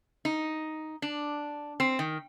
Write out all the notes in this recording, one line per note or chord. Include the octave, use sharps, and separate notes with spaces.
D#4
D4
C4
D#3